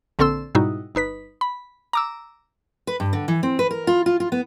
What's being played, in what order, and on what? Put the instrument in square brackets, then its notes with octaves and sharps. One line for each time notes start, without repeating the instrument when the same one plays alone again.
[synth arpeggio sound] A#1 D3 C4 A4 C6 E6
G#2 B2 G3 D#4 E4 F#4
G1 D#4 B4 B6
B5
A#5 D6 E6
[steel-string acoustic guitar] B4
G2
D3
E3
C4
B4
A#4
F4
F4
F4
B3